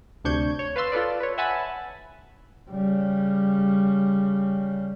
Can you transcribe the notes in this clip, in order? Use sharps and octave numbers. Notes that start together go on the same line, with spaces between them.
D2 C3 D4 C#6 G6 G#6
C#5
B4 F5 A5 C6 E6
F4 A4 B4 D5
B4 C#5
E5 F#5 G#5 A5 B5
C#3 G3